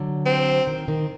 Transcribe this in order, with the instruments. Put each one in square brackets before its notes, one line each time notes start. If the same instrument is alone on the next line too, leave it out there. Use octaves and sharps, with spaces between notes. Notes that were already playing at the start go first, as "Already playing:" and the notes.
Already playing: [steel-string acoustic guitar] D3 F#3
[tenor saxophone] C4
[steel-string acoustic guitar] D#3
D#3